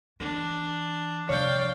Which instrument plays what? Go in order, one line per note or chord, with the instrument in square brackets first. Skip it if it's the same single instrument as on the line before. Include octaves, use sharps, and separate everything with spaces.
[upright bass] E3 [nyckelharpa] D4
[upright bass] C3 F3 [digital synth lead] C#5 [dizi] D5 [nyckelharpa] F5 G5